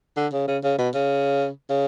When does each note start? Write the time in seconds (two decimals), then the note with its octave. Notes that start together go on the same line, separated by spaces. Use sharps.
0.17 D3
0.33 C#3
0.48 C#3
0.64 C#3
0.78 B2
0.94 C#3
1.70 C#3